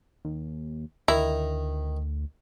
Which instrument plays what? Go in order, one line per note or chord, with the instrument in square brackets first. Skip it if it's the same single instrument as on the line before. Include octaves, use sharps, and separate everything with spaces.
[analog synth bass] D#2
[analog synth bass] D2 [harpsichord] D#3 A#5 [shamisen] E4